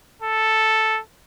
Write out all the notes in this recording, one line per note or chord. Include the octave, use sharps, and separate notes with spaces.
A4